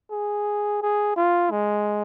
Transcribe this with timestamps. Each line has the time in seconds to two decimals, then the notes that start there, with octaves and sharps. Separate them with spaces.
0.11 G#4
0.82 G#4
1.16 F4
1.51 G#3